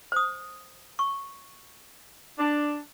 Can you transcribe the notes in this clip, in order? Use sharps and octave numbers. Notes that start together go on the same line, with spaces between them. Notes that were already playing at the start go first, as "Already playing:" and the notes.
C5 D#6
C#6
D4